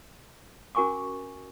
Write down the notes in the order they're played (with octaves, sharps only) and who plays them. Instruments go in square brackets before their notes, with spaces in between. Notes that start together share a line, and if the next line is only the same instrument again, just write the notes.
[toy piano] C#4 F#4 A#4 G#5 C#6 D6